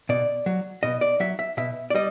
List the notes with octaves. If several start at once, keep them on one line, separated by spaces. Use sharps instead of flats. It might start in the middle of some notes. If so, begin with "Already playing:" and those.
B2 D5
F#3
B2 D#5
D5
F#3 E5
E5
B2 E5
D5
G3 D#5